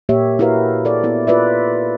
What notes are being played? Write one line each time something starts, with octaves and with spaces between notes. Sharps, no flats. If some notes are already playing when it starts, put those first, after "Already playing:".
A#2 A#3 G4 C#5 E5
E4 F#4 A#4 B4 F5
A4 D5
B3 E4
F4 B4 D5 E5